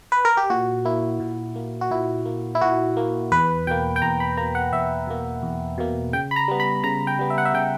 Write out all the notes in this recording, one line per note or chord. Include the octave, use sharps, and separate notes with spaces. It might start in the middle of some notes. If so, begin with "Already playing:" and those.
B4
A#4
G4
A#2 F#4
A#3 E4
A#2
A#3
F#4
A#2 E4
A#3
E4
A#2 F#4
A#3
E2 B4
B2 A#3 G5
G5
E2 A#5
B5
B2 A#3 A#5
F#5
E2 E5
B2 A#3
E2
B2 A#3
C#3 G5
B5
A#5
G3 B3
B5
C#3 A#5
G5
G3 B3
E5
F#5
E5
C#3 G5